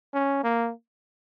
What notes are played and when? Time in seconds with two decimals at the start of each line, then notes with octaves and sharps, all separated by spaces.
0.13 C#4
0.44 A#3